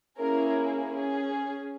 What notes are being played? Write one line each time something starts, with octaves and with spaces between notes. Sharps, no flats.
A#3 C#4 E4 G#4 A#4
C#4 G#4